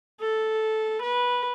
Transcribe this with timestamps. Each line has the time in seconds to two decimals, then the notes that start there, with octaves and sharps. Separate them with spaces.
0.21 A4
1.03 B4